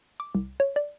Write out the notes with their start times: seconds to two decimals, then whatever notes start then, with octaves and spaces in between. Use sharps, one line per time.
0.20 D6
0.35 C2
0.60 C#5
0.76 D5